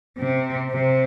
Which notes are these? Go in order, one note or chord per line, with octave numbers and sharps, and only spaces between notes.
C3
C3